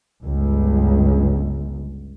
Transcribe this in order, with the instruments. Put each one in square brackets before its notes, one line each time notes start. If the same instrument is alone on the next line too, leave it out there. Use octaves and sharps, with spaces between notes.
[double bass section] G1 C#2